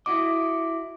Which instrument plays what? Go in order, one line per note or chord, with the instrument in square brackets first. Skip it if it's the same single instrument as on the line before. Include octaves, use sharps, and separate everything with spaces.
[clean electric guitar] E4 F#4 D#5 [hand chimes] D6